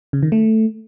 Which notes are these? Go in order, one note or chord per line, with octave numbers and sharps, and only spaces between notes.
C#3
D#3
A3